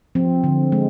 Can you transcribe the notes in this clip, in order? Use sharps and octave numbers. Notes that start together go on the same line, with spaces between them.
F3 C4
D3
G#3